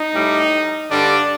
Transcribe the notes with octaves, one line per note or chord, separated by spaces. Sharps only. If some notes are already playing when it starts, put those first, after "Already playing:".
Already playing: D#4
A2 G3
G2 D3 G3 D4